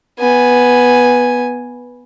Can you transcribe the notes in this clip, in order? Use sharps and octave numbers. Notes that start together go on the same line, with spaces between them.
B3 G#5